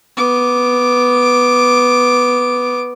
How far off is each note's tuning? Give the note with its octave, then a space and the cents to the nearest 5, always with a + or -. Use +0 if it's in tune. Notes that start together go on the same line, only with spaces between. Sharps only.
B3 +0 D6 +0